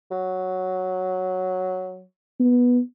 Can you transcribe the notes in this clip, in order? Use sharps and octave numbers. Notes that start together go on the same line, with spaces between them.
F#3
B3